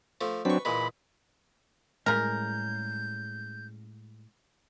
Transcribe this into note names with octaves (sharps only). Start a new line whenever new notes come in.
F3 A3
F#3 C4 D4 B4 C#6
A#2 E3 G#3 B5
A2 C#3 G3 G#3 A#4 G6